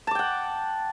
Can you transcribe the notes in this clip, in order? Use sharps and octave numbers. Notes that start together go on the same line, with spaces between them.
F#5 G5 A5 D6